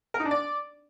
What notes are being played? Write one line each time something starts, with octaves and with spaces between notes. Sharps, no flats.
A#4
D#4
D4
D5